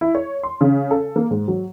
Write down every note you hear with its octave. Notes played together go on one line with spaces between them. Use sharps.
E4
C#5
C6
C#3
A4
A#3
G#2
F#3